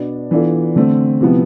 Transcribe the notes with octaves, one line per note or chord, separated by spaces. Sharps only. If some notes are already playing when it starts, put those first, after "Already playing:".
Already playing: B2 B3 D4
E3 B3 D4 F4 A4
D3 A3 C4
C3 F3 B3 E4